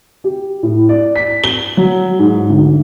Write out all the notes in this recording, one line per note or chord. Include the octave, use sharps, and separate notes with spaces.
G4
A2
D5
B6
G7
F#3
G#2
D2